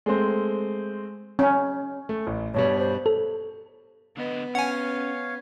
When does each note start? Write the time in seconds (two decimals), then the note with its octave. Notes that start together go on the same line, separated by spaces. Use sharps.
0.06 G#3 A3 C4 C5
1.39 C#4
2.09 A3
2.27 A1
2.54 G2 B2 G3 C#5
2.79 C5
3.06 A4
4.17 D3 B3 D#5
4.55 C#4 C#5 F5 F#5 G#5